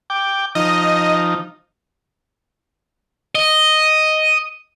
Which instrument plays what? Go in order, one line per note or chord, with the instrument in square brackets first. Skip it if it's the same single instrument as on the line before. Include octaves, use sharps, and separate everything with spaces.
[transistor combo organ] G5 D6
[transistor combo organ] F3 D#4 [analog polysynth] D#5
[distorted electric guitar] D#5